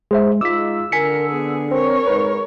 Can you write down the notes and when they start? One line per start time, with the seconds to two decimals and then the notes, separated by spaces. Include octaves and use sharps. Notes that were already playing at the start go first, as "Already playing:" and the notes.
0.11 G#3 G#4 C5 E5
0.41 G#3 D#4 F4 D6 E6 B6
0.92 D3 A#4 G#5 B6 C#7
1.29 B3 G#4
1.71 C4 A#4 C#5
2.07 G#2 B4